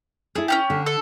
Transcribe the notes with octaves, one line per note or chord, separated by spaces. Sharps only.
E4 G#4 A4
C#4 F4 G4
D3
A4